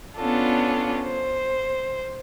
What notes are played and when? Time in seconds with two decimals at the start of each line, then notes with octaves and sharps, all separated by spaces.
0.17 B3 C#4 D4 F4 A4
1.03 C5